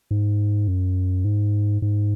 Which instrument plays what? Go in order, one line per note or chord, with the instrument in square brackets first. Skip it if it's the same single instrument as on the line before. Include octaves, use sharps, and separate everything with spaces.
[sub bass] G#2
F#2
G#2
G#2